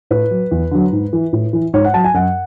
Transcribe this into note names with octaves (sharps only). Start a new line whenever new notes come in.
A2 B4
F#3
E2
D3 F#3
G#2
E3
A2
E3
G#2 C#5
F#5
F#3 A5
G#5
F#2 F#5